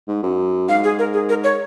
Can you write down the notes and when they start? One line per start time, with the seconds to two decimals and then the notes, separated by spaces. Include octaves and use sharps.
0.08 G#2
0.23 F#2
0.69 G#2 F5
0.84 G#4
0.99 A#4
1.14 G#4
1.29 A#4
1.44 C#5